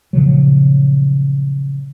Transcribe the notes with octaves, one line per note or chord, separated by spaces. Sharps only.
A#2 C#3 F3 F#3